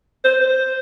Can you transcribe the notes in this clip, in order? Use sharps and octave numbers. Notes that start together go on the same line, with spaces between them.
C5
C5